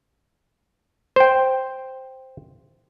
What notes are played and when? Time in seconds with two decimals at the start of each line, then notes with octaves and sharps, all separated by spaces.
1.16 C5 G5